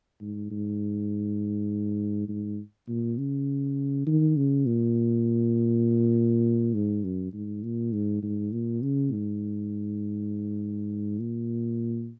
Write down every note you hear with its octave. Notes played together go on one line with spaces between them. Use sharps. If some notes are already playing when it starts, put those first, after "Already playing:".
G#2
G#2
G#2
A#2
C#3
D#3
C#3
A#2
G#2
F#2
G#2
A#2
G#2
G#2
A#2
C#3
G#2
A#2